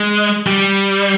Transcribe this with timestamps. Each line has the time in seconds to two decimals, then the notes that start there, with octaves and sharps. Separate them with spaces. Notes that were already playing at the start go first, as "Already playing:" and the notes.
Already playing: G#3
0.47 G3